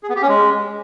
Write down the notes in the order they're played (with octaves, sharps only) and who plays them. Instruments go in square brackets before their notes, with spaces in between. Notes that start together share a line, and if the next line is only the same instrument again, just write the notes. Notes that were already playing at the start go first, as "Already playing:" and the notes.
[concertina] G#4
B3
G4
C#4
G#3